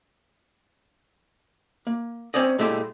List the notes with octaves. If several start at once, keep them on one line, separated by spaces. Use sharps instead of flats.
A#3
C4 C#4 C5 D5 D#5
A#2 G#3 A3 E4 G4